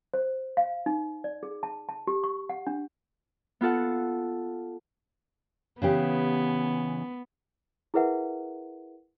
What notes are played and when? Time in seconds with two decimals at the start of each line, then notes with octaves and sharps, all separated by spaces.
0.14 C5
0.57 F5
0.86 D#4
1.24 D5
1.43 G#4
1.63 A5
1.89 A5
2.07 G4
2.24 C#6
2.49 F#5
2.67 D4
3.61 B3 F4 A4 F#5
5.82 C#3 E3 B3 G4
7.94 E4 G#4 A#4 B4 E5 F#5